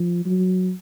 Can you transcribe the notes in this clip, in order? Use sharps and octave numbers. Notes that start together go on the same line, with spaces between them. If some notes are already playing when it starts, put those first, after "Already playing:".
Already playing: F3
F#3